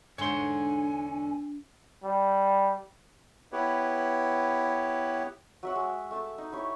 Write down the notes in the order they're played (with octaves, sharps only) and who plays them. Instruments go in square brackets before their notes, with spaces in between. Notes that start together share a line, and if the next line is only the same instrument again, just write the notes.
[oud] E2 G#2 D3 [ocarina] D4 [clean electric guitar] C#5 C6 [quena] G#5
[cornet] G3
[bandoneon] B3 E4 G4 B4 C#5
[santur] F#3 E5 F#5
G#3
A3 E5 A5
D#4
E4 G4 C#5